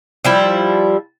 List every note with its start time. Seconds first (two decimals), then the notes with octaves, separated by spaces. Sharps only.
0.24 F3 G3 E4